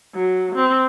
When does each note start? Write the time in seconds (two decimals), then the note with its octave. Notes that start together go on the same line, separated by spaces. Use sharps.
0.15 F#3
0.55 C4